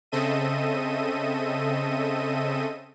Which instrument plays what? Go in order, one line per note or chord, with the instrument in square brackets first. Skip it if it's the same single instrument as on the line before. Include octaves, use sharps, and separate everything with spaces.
[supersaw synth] C#3 C4 A4 D#5 E5 D#7